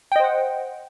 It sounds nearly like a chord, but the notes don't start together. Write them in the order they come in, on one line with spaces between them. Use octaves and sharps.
G5 D#5 C5 F#5